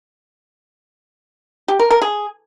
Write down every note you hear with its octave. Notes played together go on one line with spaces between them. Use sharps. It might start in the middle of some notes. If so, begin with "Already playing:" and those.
G4
A#4
A#4
G#4